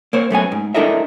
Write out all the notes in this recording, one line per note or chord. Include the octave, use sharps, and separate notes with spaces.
A#3 C5 C#5
F#2 A3 B3 G#5
G#2
D4 E4 A4 A#4 D#5 E5